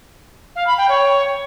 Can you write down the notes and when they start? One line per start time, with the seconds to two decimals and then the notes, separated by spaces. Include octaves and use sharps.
0.55 F5
0.66 B5
0.78 G5
0.89 C#5